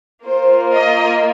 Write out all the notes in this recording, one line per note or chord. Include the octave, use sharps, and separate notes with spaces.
A#3 F4 C5
D#5